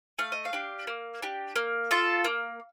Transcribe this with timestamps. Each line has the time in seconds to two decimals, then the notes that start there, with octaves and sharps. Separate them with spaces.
0.19 A3 F5
0.32 D#5
0.45 F5
0.53 D4 G4
0.87 A#3
1.22 D4 G4
1.56 A#3
1.91 F4 A4
2.24 A#3